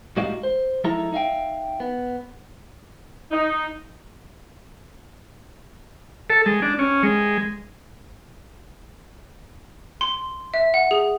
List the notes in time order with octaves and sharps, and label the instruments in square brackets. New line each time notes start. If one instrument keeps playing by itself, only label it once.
[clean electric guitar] A2 G3 G#3 D#4 F#4 F5
C5
F3 G#3 D#4 E4 A4 A#5
D#4 E5 F5 G5
B3
[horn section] D#4
[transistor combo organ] A4
G#3
D4
C#4
G#3
[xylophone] C6
E5
F#5
G#4